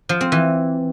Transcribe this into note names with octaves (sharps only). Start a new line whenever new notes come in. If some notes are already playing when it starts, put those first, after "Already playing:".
F3
C4
E3